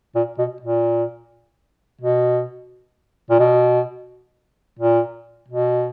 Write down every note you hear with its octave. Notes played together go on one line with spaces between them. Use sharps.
A#2
B2
A#2
B2
A#2
B2
A#2
B2